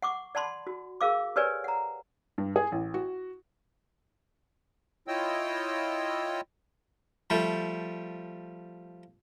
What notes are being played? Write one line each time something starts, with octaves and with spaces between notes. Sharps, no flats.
F#5 C#6 D6
D5 F#5 A5 B5 C6
F#4
G#4 A#4 F5 D6
G4 A#4 B4 C#5 D5 G#5
F#5 A#5
G2
G#4
A1
F#4
E4 F4 C#5 D#5 G5 E6
F3 G3 A3